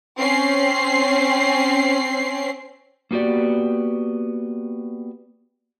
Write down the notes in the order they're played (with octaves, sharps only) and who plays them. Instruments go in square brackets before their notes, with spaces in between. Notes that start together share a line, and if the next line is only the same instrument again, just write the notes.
[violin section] C4 C#4 C7
[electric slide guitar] A#3 B3 F#4 G4 D5